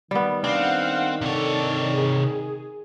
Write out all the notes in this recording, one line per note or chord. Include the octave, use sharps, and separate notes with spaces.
D#3 G3 B3
C4 D4 F5 F#5
C3 A4 C#5 D5
G#4